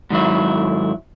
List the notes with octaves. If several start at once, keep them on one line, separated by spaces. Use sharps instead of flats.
G#2 D#3 F#3 E4